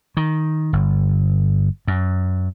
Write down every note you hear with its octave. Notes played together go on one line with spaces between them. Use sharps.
D#3
G1
F#2